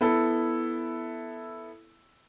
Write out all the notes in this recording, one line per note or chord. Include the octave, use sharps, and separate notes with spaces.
B3 E4 A4